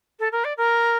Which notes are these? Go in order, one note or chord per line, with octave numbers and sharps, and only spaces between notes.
A4
A#4
D5
A#4